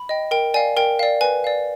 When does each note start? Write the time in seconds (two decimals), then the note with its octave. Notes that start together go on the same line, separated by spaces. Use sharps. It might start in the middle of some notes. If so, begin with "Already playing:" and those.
Already playing: B5
0.09 D#5 G5
0.31 A#4 G5
0.54 D5 F5 G#5
0.77 A#4 G5
0.99 D5 F5
1.21 B4 G#5
1.44 D5 F5